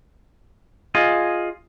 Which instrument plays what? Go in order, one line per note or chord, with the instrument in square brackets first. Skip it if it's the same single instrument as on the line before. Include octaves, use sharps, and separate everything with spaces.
[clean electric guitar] F4 G#4 D#5